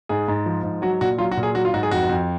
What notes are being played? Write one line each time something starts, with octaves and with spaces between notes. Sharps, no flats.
G#2 G#4
G#2
F3
G#2
F#3 F#4
A#2 F#4
F#3 F4
F#4
A#2
G#4
F#3 F#4
F4
G#2 F#4
G#4
F2 F#4
F2